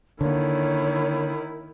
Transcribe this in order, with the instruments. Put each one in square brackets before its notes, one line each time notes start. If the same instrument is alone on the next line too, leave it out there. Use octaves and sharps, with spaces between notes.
[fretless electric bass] D3 A#3 [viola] D#3 E4 [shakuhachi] C#5